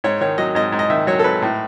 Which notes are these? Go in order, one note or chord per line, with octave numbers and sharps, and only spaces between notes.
G#2 C#5
D#3 C#5
F#3 D#5
G#2 D#5
G#2
D#5
D#3 E5
F#3 C#5
A4
G#2 B4
A2